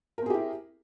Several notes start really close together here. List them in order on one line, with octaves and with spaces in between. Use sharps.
A#4 C4 G#4 G4 E4